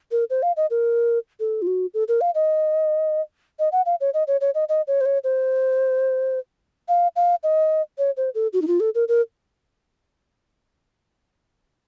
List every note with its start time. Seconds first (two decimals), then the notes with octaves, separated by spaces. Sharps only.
0.11 A#4
0.30 C5
0.43 F5
0.57 D#5
0.70 A#4
1.40 A4
1.62 F4
1.67 F#4
1.94 A4
2.08 A#4
2.21 F5
2.35 D#5
3.59 D#5
3.72 F#5
3.86 F5
4.01 C#5
4.14 D#5
4.27 C#5
4.41 C#5
4.55 D#5
4.69 D#5
4.87 C#5
5.01 C5
5.05 C#5
5.24 C5
6.88 F5
7.16 F5
7.43 D#5
7.98 C#5
8.17 C5
8.35 A4
8.53 F#4
8.62 D#4
8.67 F4
8.80 A4
8.95 A#4
9.08 A#4